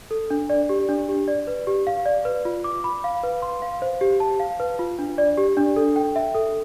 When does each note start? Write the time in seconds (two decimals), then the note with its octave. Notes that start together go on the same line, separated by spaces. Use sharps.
0.11 A4
0.30 D4
0.50 D5
0.69 G4
0.89 D4
1.09 G4
1.28 D5
1.47 B4
1.67 G4
1.87 F5
2.06 D5
2.25 B4
2.45 F4
2.64 D6
2.84 B5
3.04 F5
3.23 B4
3.42 C6
3.62 F5
3.82 C5
4.01 G4
4.20 A5
4.40 F5
4.60 B4
4.79 F4
4.99 D4
5.18 D5
5.38 G4
5.57 D4
5.76 A4
5.96 G5
6.16 E5
6.35 A4